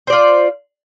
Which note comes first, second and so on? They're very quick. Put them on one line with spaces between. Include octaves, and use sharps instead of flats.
C5 D5 F4